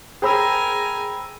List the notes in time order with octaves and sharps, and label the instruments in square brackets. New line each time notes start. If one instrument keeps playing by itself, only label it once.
[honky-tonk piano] G#4 C5 [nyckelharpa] A#4 G#5 [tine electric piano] G5 B5 E6